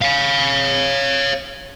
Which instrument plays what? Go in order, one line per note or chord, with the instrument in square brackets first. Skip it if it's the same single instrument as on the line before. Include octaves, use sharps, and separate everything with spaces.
[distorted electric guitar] C#5 F5